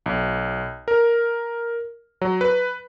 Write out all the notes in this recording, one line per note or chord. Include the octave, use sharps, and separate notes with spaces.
B1
A#4
F#3
B4